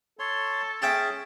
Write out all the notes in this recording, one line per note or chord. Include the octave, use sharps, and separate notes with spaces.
A4 C#5 C6
C#4 G#4 E5 G5 A5